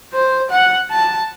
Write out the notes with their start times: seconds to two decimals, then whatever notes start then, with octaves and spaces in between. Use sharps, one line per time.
0.13 C5
0.50 F#5
0.91 A5